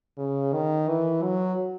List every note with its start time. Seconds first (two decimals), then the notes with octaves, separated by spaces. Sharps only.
0.18 C#3
0.52 D#3
0.88 E3
1.22 F#3